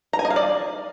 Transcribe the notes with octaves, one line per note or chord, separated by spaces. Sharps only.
A#5
G#5
D#5
F5
D5